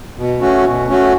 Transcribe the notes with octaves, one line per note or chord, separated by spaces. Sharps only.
B2
A3 C#4 F#4
B2
A3 C#4 F#4